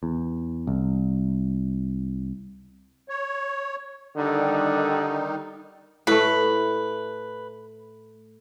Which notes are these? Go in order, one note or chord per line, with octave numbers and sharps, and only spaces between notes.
E2
C2
C#5
D3 D#3 G3 D#4
A2 A3 B4